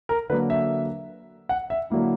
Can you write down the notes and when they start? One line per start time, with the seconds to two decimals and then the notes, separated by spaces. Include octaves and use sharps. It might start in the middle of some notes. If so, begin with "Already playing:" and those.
0.09 A#4
0.29 D3 F#3 A#3 B4
0.50 E5
1.49 F#5
1.70 E5
1.90 D3 F#3 A#3 E4